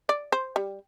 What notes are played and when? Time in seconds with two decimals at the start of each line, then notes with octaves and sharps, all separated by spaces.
0.09 D5
0.32 C5
0.56 G3